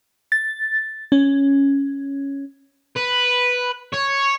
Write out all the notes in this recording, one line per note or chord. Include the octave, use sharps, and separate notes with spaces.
A6
C#4
B4
C#5